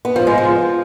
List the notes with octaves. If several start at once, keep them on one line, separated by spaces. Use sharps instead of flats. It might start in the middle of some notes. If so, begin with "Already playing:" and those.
B3
F3
G#3
F3